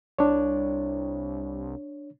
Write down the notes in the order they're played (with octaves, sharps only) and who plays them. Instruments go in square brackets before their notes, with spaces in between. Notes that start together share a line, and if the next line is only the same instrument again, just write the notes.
[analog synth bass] C2 [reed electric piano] D4 C#5